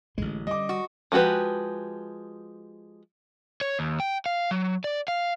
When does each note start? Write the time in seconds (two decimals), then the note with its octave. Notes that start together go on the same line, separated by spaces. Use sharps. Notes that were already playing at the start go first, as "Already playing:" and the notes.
0.18 A1 D3 G#3 C#4
0.47 G3 D#5 D6
0.69 F#4
1.12 F3 G#3 F#4 G4 B4
3.61 C#5
3.79 D#2
4.00 G5
4.26 F5
4.51 F#3
4.84 D5
5.08 F5